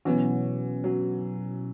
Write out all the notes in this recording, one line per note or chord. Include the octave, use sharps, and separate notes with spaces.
B2 E3 F#3 C#4 F#4
F#3